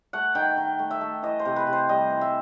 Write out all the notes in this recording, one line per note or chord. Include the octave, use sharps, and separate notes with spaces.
A3 F#5
D#3 G5
D#3
A3
E5
A3
E3 D#5
C5
C3
B4
C3
C5
G3 D#5
E3
E5